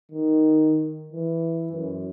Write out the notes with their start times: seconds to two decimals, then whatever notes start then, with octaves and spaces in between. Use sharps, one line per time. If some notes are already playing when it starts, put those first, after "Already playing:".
0.11 D#3
1.13 E3
1.72 F#2